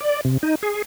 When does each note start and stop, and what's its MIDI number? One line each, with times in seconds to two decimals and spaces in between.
0.01 0.21 74
0.25 0.38 48
0.43 0.55 63
0.63 0.82 68